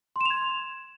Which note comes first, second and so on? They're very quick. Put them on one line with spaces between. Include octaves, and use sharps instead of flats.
C6 E7 F7 G#6